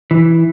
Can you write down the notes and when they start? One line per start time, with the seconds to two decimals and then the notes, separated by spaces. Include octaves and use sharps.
0.11 E3